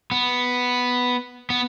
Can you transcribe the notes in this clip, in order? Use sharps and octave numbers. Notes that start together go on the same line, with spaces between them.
B3
B3